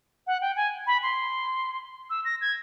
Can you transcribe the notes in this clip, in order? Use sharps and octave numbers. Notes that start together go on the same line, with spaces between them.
F#5
G5
G#5
B5
C6
E6
A#6
G#6